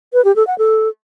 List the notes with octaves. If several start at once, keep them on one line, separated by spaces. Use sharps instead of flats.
B4
G4
A4
F#5
A4